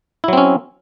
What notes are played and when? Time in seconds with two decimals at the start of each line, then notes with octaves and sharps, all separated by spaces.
0.24 E4
0.28 F#3
0.33 C4
0.37 C#4